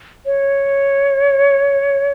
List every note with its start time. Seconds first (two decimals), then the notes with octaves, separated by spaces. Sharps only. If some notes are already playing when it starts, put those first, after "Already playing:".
0.26 C#5